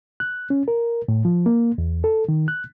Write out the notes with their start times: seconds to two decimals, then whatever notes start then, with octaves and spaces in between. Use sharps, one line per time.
0.20 F#6
0.50 C#4
0.68 A#4
1.08 A2
1.25 F3
1.46 A#3
1.78 E2
2.04 A4
2.29 D#3
2.48 F#6